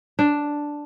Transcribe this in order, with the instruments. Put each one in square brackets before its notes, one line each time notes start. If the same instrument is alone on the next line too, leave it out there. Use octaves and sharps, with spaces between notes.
[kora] D4